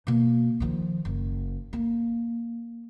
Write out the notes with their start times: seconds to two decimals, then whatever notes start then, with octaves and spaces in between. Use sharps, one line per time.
0.07 B2 A#3
0.60 D#3 F3
1.05 F#1
1.73 A#3